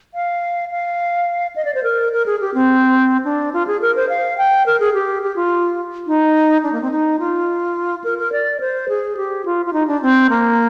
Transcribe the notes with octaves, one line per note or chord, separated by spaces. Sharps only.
F5
F5
D#5
D5
C5
A#4
A#4
G#4
G4
C4
D4
F4
G#4
A#4
C5
F5
G5
A#4
G#4
G4
G4
F4
D#4
D4
A#3
C4
D#4
F4
A#4
A#4
D5
C5
G#4
G4
F4
F4
D#4
D4
C4
A#3